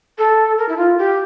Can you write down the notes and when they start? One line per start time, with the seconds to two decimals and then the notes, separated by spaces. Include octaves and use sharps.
0.18 A4
0.58 A#4
0.69 E4
0.77 F4
0.98 G4